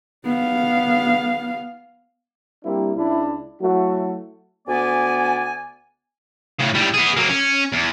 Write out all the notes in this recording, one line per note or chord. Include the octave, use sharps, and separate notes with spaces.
B3 F5
G3 A#3 C4 D4 E4
C#2 D4 E4
F#3 A3 E4 F#4
D2 B3 D5 G#5
A2 C#3
A2 G3
B3 G#4
F#3 A#3
C#4
E2